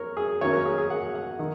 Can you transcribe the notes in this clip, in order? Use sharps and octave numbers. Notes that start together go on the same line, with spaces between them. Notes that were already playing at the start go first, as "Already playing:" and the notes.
Already playing: A#4 C#5
G#4
D#3 F#3 A#3 C#4 C#5
A#4
G#4
G#4
F#5
F#5
D#3